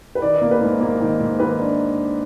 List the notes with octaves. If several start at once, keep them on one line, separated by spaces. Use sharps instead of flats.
B4
D#3 D5
A#3
B4
G#2
A#3
D#3
G#2
D#3 B4
D4